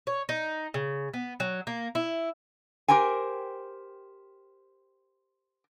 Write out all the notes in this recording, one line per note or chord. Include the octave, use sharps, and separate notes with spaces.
C#5
D#4
C#3
B3
F#3
A#3
E4
G4 A#4 C5 G5 G#5